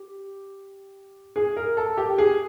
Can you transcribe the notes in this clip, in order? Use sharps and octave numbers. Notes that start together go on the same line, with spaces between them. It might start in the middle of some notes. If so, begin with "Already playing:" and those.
Already playing: G4
G#4
A#4
A4
G4
G#4